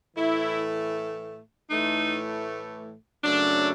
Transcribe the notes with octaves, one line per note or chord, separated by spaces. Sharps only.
A2 E3 A3 E4
A2 E3 A3 D#4
F#2 C#3 F#3 A3 D4